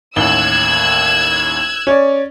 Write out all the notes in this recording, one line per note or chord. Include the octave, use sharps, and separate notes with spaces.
A1 D#2 E6 F#6 G#6 G7
C#4 C#5 D5